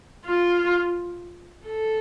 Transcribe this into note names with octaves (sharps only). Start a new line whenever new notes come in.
F4
A4